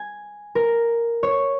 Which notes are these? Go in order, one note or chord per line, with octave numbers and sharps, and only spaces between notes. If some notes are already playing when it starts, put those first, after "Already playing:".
Already playing: G#5
A#4
C#5